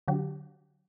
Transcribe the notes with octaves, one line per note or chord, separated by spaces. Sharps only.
D3 F#3 G4